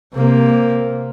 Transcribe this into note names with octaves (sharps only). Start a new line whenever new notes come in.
C3 A#3